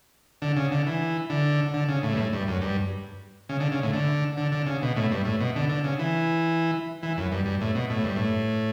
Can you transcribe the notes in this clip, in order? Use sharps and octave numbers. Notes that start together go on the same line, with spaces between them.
D3
C#3
D3
E3
D3
D3
C#3
A2
G2
A2
G2
F#2
G2
C#3
D3
C#3
A2
D3
D3
D3
C#3
B2
A2
G2
A2
B2
D3
D3
C#3
E3
E3
F#2
G2
G2
A2
B2
A2
G2
A2